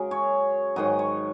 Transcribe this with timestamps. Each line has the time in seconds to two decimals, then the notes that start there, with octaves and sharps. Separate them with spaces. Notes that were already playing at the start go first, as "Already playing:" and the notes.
Already playing: F#2 C#3 G#3 F#4 G#4 A#4
0.11 C#5
0.76 G#2 D#3 F#3 D#5
0.99 C#5